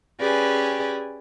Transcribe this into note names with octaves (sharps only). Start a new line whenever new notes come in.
C#4 G4 G#4 B4 D5 G#5